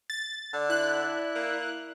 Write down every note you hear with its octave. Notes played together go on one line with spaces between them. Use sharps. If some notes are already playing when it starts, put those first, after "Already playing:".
A6
D3 D5
E4 F#6
A#3